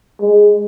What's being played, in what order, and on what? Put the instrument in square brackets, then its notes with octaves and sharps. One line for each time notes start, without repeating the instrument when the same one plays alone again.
[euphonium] G#3